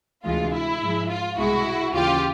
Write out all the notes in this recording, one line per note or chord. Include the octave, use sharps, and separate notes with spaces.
D2 C3 E3 G#3 F4
E4
G#2 F3 G#3
F4
C2 B2 G#3 E4 F#4
D#2 C#3 E3 F4 G4